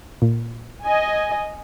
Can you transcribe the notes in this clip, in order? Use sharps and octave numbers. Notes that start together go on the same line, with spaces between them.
A#2
D#5 G#5